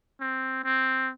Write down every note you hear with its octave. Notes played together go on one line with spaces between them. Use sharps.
C4
C4